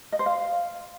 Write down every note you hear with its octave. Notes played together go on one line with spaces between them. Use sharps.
D#5
C5
F5